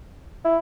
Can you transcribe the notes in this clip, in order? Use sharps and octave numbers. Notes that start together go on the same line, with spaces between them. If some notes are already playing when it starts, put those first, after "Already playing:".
E4